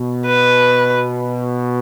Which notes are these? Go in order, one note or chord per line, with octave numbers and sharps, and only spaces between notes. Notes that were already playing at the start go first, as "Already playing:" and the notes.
Already playing: B2
B4